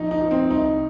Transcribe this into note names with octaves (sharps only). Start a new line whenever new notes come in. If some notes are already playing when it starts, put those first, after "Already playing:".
Already playing: A#1 D#4
D#4
F3
C4
C2 D#4